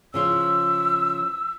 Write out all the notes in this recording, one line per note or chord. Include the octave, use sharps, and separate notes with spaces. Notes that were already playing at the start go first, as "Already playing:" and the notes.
C#3 F3 F4 E6